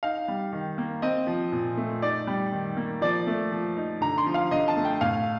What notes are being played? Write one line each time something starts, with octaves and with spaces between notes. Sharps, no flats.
D#4 F5
G3
D#3
A#3
C4 D#5
F3
A#2
A3
D#4 D5
G3
D#3
A#3
F3 D5
A3
F3
D#4
D3 A#5
C6
F3
F5
D3 D#5
A5
A3
G5
A2 F5